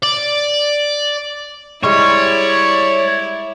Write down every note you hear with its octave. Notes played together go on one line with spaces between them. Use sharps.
D5
G3 G#3 E4 C#5 D5